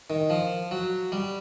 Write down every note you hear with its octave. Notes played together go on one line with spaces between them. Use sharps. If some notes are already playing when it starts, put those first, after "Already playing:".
D#3
F3
F#3
G3